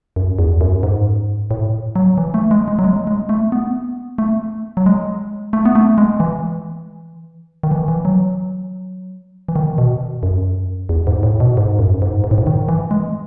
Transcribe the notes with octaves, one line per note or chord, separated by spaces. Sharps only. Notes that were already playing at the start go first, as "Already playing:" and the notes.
F#2
E2
F#2
G#2
A2
F#3
E3
A3
G#3
G#3
F#3
G#3
G#3
A3
B3
A3
F#3
G#3
A3
B3
A3
G#3
E3
D#3
E3
E3
F#3
E3
D#3
B2
F#2
E2
G#2
A2
B2
G#2
F#2
G#2
G#2
A2
G#2
D#3
E3
G#3